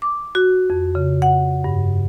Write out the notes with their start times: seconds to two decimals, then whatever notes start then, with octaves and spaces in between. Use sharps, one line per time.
0.02 D6
0.35 F#4
0.70 F2
0.95 C#3
1.22 F#5
1.64 G2